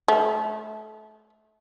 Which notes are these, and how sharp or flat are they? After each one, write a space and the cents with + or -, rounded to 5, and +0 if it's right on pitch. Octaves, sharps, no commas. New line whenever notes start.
A3 -30